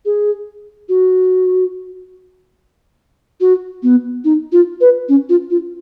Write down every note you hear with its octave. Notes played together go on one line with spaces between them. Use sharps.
G#4
F#4
F#4
B3
D#4
F4
B4
C#4
F4
F4